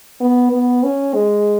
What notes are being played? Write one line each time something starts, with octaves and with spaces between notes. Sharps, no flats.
B3
B3
C#4
G#3